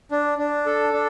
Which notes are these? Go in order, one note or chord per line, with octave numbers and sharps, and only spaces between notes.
D4
D4
A4
D4